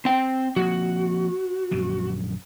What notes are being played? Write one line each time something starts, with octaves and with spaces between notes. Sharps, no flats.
C4 G5
F3 A#3 C4 F#4
A#1 F#2 D3